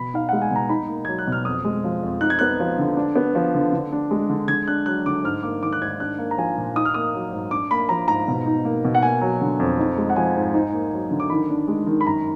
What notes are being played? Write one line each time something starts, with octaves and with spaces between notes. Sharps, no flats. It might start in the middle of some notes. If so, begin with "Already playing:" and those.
Already playing: B2 B5
D#4 F5
G#3 F#5
G#5
B2 A#5
D#4 B5
A#3
F#3 G#6
F#6
B2 F6
F2 D#6
G#3
F3
F2
D#4 F#6
G#6
B3 F#6
F3
D3
D4
B3
F3
D3
D3
D4
G#3
D3
D3 G#6
D4 F#6
F#3 F#6
D3 D6
G#2 F6
A#3 D6
D#3 D6
F#6
G#2 G#6
D4 F#6
A#3
A#5
F3 G#5
A#2
D#4 D#6
F6
A#3 D#6
F#3
G#2
D4 D6
A#3 B5
F3 A#5
G#2 A#5
B2
D#4
A#3
B2
F#5
A#3 G#5
F#3
D3
F2
D#4
G#3
F#5
F3 G#5
G#2
D#4
A#3
F#3
D3
D6
D#3 B5
D4
G#3
D#3
B5
F#2 A#5